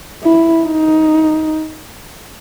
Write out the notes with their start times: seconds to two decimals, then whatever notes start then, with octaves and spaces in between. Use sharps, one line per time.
0.24 E4
0.65 D#4